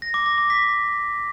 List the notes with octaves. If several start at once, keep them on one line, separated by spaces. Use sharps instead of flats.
A#6
D6
A#6
D6
B6